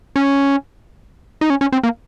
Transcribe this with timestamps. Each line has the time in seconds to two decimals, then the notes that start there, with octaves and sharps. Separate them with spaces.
0.16 C#4
1.41 D#4
1.50 C#4
1.61 C#4
1.72 C4
1.83 A#3